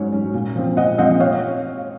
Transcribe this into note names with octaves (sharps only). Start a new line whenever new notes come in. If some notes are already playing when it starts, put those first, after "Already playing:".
Already playing: G#2 F#3 C#4 C#5
F#3 C#4
A#2
F3 C4
A#2 D#5 F#5
F3 C4 D#5 F#5
C#5 F5